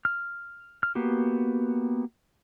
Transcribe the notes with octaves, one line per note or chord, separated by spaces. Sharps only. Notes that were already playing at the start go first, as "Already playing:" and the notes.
F6
F6
A#3 B3 F#4 G4